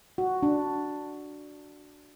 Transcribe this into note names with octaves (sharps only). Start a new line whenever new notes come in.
F#4
D4